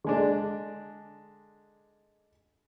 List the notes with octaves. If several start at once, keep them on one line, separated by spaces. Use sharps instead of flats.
D3 G#3 D4